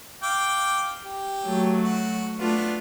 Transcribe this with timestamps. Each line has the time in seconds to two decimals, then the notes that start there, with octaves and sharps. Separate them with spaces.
0.23 F5 G5 D6
1.05 G4
1.45 F#3 A3
1.82 F#4
2.39 A3 B3 D4 F4